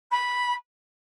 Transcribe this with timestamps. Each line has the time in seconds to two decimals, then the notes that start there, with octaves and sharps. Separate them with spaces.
0.11 B5